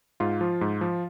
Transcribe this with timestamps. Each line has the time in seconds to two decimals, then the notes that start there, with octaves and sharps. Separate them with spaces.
0.20 G#2 F4
0.41 F3
0.61 G#2
0.81 F3